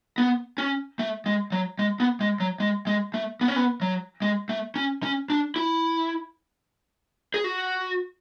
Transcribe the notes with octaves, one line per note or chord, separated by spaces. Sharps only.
B3
C#4
A3
G#3
F#3
G#3
B3
G#3
F#3
G#3
G#3
A3
B3
C#4
B3
F#3
G#3
A3
C#4
C#4
D4
E4
G#4
F#4